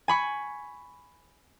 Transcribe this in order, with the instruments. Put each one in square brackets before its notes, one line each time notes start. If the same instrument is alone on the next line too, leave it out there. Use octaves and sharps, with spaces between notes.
[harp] G#5 B5 C#6